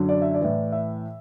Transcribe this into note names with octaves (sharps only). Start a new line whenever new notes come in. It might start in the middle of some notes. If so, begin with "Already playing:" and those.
Already playing: F#2 D3 F#3
D5
E5
D5
A2 E3
E5